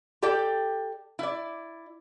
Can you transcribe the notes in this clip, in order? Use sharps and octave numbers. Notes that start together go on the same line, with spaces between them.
G4 A4 D5 G5
E4 D5